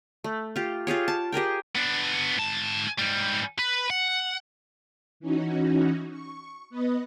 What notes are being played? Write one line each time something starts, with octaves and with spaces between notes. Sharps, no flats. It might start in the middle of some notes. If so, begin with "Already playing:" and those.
A3
F4 G4
F4 G4 G#4 C#5
A5
G4 G#4 A#4 G5
B3 D4
G#2 A5
G#2 G3
B4
F#5
E3 C#4 D#4 F#4
C#6
B3 B4 D#5